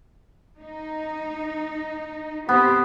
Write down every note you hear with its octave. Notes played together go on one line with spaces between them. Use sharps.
D#4
C3 B3 G4 C5